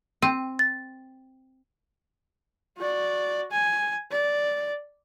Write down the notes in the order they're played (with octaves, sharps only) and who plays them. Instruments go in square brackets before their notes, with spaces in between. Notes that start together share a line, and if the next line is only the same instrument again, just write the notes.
[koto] C4 [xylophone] D#7
[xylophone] A6
[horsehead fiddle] F#4 D5
G#5
D5